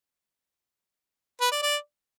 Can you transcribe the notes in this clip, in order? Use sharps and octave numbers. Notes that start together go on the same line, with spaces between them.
B4
D5
D5